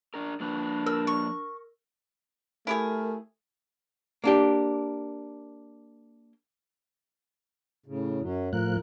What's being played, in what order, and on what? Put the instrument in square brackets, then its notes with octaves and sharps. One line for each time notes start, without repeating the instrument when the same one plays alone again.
[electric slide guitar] D4 A#4
[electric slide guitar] F3 A#3 B4 [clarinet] D4
[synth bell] A#4 [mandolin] E6
[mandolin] C#6
[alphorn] A3 [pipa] E4 G4 G#4 [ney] A#4
[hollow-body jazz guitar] A#3 D4 G4
[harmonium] A2 C#3
F#2 F#3
[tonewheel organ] A2 F3 F#6 [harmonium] A#4